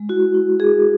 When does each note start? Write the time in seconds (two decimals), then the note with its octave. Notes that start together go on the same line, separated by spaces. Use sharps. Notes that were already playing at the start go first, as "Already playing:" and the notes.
Already playing: G#3
0.09 E4 F#4
0.34 E4
0.60 E4 G#4